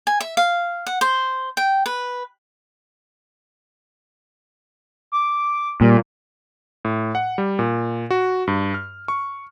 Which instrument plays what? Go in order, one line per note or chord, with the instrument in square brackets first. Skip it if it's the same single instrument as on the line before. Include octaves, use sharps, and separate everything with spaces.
[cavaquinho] G#5
E5
F5
F#5
C5
G5
B4
[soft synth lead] D6
[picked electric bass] A#2 [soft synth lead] G3
[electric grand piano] A2
F#5
G3
A#2
F#4
G2
F6
C#6